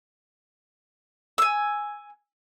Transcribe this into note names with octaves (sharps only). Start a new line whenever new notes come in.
G#5 E6